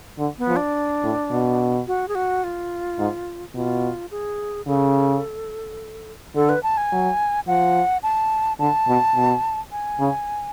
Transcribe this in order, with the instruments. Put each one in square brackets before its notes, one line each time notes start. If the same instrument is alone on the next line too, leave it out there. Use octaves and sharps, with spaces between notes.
[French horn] D3
[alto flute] B3
[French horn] F3
[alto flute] D4
[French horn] A2
B2
[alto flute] F#4
G#4
F#4
F4
[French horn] G#2
[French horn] B2 [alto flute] F4
[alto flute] G#4
[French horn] C#3 [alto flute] A4
[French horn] D3 [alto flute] A4
[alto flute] B4
A5
G#5
[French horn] F#3
[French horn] F3 [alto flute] F#5
[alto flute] A5
[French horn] D3 [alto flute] A5
[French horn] B2
B2
[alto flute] G#5
[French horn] C#3